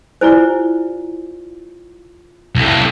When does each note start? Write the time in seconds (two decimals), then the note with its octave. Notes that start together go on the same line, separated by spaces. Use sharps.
0.21 E4 F4 G4 C5 D5 G#5
2.55 C2 A2